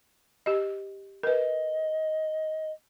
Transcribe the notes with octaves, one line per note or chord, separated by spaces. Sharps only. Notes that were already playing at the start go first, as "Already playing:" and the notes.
G4 D#5
A#4 B4 D#5